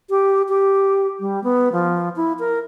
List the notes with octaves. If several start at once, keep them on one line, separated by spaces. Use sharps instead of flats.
G4
G4
G3
B3
F3
E4
A#4